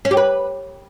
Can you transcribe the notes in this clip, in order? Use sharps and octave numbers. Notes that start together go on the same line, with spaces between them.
C#4
G4
B4